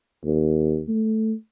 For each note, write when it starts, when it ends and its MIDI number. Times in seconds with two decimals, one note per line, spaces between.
0.25 0.81 39
0.88 1.32 57